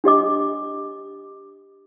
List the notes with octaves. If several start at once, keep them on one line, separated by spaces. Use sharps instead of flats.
D4 G4 D#5 D6